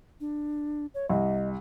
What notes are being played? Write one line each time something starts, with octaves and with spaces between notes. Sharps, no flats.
D4
C#5
C2 D#5